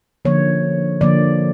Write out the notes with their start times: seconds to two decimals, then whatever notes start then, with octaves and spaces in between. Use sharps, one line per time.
0.25 D3 F3 A#3 C#5
1.01 D3 F3 A#3 D5